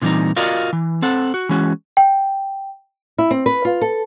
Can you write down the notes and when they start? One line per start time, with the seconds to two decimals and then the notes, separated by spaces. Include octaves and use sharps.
0.02 A#2 D3 E3 G3 C4 D#4
0.36 F4 F#4 A#4 D5 D#5 F5
0.73 E3
1.02 C4 A4 F#5
1.34 F#4
1.49 E3 G#3 C#4 F#4
1.97 G5
3.18 E4
3.31 C4
3.46 B4
3.65 F4
3.82 A4